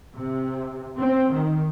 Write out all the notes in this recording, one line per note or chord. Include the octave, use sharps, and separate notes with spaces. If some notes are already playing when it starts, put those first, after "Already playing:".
C3
C4
D#3